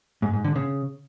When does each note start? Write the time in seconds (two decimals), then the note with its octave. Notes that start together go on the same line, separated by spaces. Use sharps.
0.22 G#2
0.33 G#2
0.44 D3
0.56 C#3